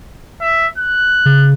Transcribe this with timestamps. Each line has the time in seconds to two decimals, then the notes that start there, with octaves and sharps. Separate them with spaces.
0.41 E5
0.78 F#6
1.26 C#3